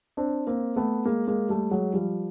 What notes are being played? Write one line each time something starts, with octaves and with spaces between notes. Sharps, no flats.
C4 D4
A#3 C4
A3 B3
G#3 A#3
G#3 A#3
G3 A3
F#3 G#3
F3 G3